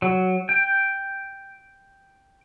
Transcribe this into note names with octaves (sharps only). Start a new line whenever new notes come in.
F#3
G5